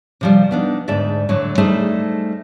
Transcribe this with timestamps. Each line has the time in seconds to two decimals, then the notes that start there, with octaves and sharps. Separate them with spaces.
0.21 C3 F3 G3
0.51 B3 D4 D#4
0.88 D2 G#2 A4 D5 E5
1.29 A2 D3 F#3
1.58 G3 A3 D#4 G#4 C5 E5